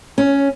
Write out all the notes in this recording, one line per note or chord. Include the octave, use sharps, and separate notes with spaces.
C#4